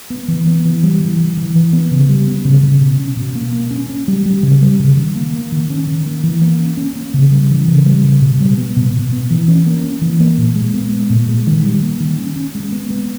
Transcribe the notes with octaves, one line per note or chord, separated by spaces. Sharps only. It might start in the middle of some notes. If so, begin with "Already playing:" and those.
B3
E3
B3
E3
G3
E3
E3
E3
E3
B3
C#3
G3
B3
C#3
C#3
B2
C#4
B2
A#3
A#3
C#4
C#4
G3
G3
C#3
G3
C#3
D#3
A#3
A#3
D#3
C#4
D#3
A#3
E3
A#3
C#4
C#4
A#3
C#3
G3
E3
C#3
G3
C#3
B2
G3
B3
B2
B2
B3
E3
C#4
A#3
C#4
E3
A#3
A#2
G#3
B3
G#3
A#2
G#3
D#3
G3
A#3
D#3
C#4
C#4
G#3
B3
B3